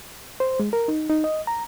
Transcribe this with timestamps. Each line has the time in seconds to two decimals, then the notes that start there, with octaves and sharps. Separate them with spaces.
0.40 C5
0.60 G#3
0.73 A#4
0.88 D#4
1.10 D#4
1.24 D#5
1.47 A#5